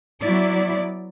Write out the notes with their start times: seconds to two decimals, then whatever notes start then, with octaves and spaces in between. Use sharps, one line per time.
0.22 F#3 B3 E4 D5